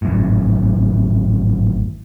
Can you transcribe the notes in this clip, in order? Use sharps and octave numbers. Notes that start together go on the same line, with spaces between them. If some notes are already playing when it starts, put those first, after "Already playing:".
G#1 F#2 A2